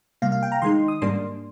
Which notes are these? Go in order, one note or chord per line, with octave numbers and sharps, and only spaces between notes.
C3 G3 A#3 F5
F5
G5
A#5
D#3 G#3 D#4 C6
D#6
G#2 G3 A#3 D4 C6